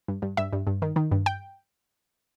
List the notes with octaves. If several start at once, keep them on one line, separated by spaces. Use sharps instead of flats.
G2
G2
G2 E5
G2
G2
D#3
D#3
G2
G5